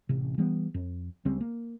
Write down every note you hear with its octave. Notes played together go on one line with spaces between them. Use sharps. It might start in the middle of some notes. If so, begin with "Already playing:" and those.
A1 C3
E3 G3 B3
F2
C#2 C#3 G3 C4
A#3